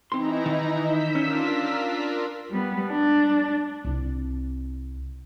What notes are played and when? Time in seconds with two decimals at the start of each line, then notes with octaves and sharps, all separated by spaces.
0.12 E3 C4 D#4 E4 A#5 C6
0.46 D#3
0.81 E6 G6 B6
1.15 C#4 D4 F4 A#4
2.50 G3 B3
2.90 D4
3.85 C2 C4